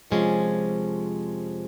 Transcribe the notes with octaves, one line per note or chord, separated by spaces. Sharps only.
F2 C3 F3 G#3 C#4